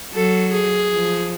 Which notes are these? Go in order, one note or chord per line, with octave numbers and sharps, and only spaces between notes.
F#3 A4
G#4
F3